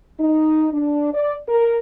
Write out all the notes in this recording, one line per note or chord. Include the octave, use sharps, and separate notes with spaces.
D#4
D4
D5
A#4